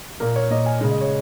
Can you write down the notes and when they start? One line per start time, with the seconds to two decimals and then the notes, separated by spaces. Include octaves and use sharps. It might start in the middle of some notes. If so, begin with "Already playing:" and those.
0.20 A#2 A#3 A#4
0.36 C#5
0.51 A#2 A#3 D#5
0.66 G#5
0.81 C#3 G#3
0.91 D#5
1.01 C#5